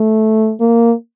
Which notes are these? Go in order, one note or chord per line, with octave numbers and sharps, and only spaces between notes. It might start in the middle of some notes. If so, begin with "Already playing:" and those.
Already playing: A3
A#3